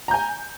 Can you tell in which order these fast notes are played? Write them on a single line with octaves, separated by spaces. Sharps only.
A#5 G6 G#5